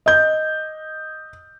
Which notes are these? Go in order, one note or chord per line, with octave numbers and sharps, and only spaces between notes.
D#5 G6